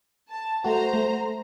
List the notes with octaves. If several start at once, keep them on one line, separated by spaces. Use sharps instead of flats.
A5
A3 F#4 C5 A#5
A3